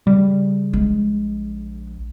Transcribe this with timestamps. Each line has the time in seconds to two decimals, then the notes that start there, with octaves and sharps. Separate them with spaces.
0.07 C#3 G3
0.73 A#1 G#3